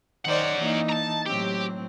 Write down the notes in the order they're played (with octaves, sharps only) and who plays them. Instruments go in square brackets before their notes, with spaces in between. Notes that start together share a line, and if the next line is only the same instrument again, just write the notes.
[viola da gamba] D#3 C5 D5 [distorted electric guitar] C#4 F#5
[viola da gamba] E3 A#3 D#4
[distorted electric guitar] A5 A#5
[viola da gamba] A2 F#3 C4 [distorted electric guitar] G4